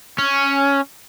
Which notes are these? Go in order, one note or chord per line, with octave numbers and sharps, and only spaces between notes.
C#4